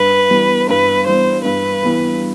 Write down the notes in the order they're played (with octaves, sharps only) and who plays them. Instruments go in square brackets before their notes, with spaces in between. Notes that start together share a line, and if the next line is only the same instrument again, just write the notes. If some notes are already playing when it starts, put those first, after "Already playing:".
Already playing: [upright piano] G2 [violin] B4
[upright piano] E3 G3 B3
[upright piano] G2 [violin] B4
[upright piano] E3 G3 B3 [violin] C5
[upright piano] G2 [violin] B4
[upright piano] E3 G3 B3